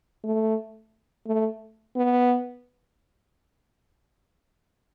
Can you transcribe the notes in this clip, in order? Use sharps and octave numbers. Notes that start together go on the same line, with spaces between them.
A3
A3
B3